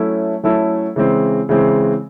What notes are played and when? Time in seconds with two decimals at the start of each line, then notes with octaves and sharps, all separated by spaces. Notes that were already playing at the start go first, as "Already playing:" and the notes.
Already playing: F#3 A3 C#4 E4 A4
0.43 F#3 A3 C#4 E4 A4
0.96 C#3 E3 G#3 C4
1.49 C#3 E3 G#3 C4